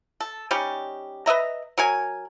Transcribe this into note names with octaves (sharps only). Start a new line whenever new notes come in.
A4
G3 C#4 D#4 G4
B4 D#5 E5 A#5
F#3 A#4 G#5